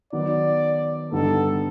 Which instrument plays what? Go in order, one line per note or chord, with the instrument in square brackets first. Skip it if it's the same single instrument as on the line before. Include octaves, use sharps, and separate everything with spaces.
[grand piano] D#3 F#3 B3 [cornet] D5
[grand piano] G2 D3 G3 B3 D#4 [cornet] A4